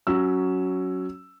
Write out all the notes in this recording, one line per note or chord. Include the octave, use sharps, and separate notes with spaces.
F#3 C#4 E6